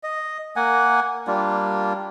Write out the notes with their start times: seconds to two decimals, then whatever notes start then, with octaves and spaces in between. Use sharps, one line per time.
0.03 D#5
0.56 A#3 F#5 G#5
1.27 G3 A#3 D4 F4